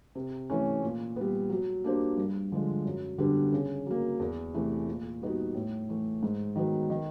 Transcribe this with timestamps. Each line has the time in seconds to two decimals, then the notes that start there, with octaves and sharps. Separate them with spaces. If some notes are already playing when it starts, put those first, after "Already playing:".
0.15 C3
0.50 E3 A3 C#4
0.82 A#2
1.16 G3 B3
1.50 F#3
1.84 A#3 D4 G4 C5
2.17 G2
2.52 D3 F3 G#3
2.86 F#2
3.18 D3 G3 B3 D4
3.52 C#3
3.86 F#3 A#3
4.20 E2
4.54 C3 E3 A3
4.88 A#2
5.22 G3 B3 D#4 F#4
5.54 A2
5.89 E3 A3
6.23 G#2
6.56 D#3 F#3 B3
6.90 D#3